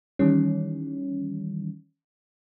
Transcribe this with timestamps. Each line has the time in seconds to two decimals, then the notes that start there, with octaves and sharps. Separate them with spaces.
0.19 D#3 E3 G3 C#4